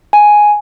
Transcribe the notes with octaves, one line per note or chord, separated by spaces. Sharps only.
G#5